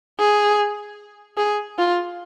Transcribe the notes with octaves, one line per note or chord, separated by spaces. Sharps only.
G#4
G#4
F4